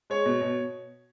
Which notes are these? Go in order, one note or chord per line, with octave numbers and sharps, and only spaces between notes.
G#3 C#5
B2
B2